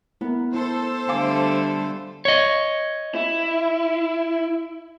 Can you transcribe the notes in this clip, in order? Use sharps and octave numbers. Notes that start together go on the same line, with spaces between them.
B3 E4 A#4
E4 A4 C5
D3 G3 A3 F5 G#5 A5 D6
C#5 D#5
E4